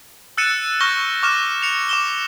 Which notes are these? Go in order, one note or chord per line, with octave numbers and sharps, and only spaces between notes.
E6 F#6 A6 C#7 D#7 E7
C#6 F6 G6 A6 A#6 G7
C#6 D6 F6 E7
C#7 F7
D6 E7 G7